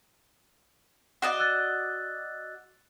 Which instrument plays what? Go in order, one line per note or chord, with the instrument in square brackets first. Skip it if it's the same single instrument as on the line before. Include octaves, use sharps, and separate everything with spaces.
[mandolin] F#4 D5 D#5
[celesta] E6 F#6 A6